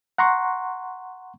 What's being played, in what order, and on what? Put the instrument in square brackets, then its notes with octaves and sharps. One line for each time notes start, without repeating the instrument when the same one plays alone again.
[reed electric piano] F#5 A#5 C6 C#6